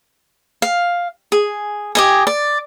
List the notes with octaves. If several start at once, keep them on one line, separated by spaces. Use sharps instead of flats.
F5
G#4
G4 D#5 G#5
D5